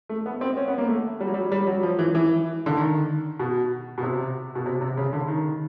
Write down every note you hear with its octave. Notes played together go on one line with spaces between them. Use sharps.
A3
B3
C4
C#4
B3
A#3
A3
G3
F#3
G3
G3
F#3
F3
E3
E3
D3
D#3
B2
B2
C3
B2
C3
C3
C#3
D3
D#3